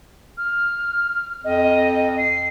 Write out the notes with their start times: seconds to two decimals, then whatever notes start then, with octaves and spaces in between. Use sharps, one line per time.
0.37 F6
1.44 F2 D#5
2.18 C7